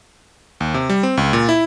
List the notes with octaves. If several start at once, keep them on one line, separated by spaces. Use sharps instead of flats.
D#2
C3
G3
C4
C#2
A#2
E4